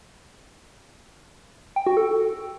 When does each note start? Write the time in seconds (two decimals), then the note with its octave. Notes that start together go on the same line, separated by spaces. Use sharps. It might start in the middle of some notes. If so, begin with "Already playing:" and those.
1.76 G5
1.87 F#4
1.97 A4